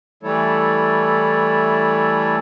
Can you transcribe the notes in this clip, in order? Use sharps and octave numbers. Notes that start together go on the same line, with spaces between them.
E3 G3 A3 E4 A4 C#5